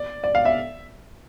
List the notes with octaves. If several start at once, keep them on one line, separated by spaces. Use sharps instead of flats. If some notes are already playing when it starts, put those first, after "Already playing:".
Already playing: D5
D5
F5
E5